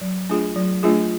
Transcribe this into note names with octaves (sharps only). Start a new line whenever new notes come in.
F#3
A3 D4 F4 G#4
F#3
A3 D4 F4 G#4